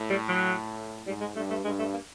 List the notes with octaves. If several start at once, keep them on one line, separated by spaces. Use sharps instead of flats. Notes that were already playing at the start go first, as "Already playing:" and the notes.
Already playing: A2
G3
F#3
G#2 G3
G#3
G2 A3
A3
G2 G#3
A3
A#3